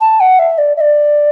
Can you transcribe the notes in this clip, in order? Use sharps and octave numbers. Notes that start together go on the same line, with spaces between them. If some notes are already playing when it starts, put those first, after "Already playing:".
A5
F#5
E5
D5
E5
D5